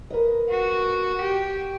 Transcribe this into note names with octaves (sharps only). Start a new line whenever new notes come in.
A#4 B4 D#5
F#4
G4